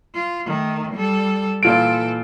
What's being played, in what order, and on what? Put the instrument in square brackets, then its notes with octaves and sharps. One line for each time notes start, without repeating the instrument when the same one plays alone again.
[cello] F4
D#3 A3
G3 A4
[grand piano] A#2 F4 D7 [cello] E3 A4